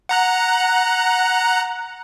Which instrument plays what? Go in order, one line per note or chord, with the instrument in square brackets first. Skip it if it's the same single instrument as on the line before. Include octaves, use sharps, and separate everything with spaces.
[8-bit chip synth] F#5 A#5 F#6